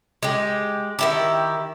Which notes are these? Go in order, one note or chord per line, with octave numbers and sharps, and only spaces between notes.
G#3 G4
D#3 E4 G4